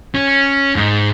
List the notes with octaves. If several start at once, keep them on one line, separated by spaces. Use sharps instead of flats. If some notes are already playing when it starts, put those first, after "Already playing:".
C#4
G#2